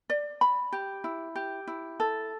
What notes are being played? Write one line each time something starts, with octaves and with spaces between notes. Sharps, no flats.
D5
B5
G4
E4
G4
E4
A4